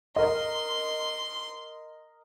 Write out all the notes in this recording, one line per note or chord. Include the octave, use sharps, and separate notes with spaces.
A#4 D#5 C6